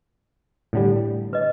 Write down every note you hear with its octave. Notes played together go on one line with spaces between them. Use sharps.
A2 D3 G3
B4 D#5